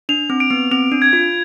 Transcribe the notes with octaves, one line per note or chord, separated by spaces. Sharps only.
D4 F7
C4
D7
B3
C4 F7
D4
G#6
F4